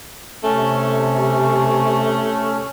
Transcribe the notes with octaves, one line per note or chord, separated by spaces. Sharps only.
C3 A3 C#4